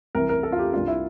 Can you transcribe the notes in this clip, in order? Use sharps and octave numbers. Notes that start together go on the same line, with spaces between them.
C2 C3 E3 A#4
A#4
A4
F4
G4
C2 C3 G3 D4 F4
E4